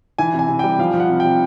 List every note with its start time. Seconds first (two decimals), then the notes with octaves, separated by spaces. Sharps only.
0.19 E3 G#5
0.34 C3
0.39 G#5
0.48 C3
0.59 G3 G5
0.79 F3 F5
0.94 F3
1.00 F#5
1.09 C3
1.20 C3 G5